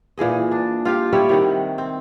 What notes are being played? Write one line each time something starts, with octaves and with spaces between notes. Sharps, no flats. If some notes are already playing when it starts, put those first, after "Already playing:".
A#2 E3 G#4 D#5
D4
F4 G4 F5
G3 E4 G4 C#5
C3 D#3 F#5
C4